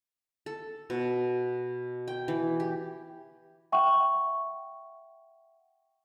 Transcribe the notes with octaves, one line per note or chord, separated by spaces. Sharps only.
A4
B2
G5
E3
G4
E5 F#5 G5 C#6